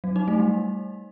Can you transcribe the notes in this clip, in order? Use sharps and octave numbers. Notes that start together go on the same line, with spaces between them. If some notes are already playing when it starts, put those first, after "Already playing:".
F#3
D#4
A3
G3